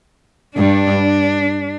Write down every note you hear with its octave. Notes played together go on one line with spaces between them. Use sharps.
G2 D4